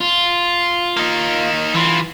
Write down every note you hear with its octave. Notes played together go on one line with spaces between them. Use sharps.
F4
A#3 D#4
D3 E3 F4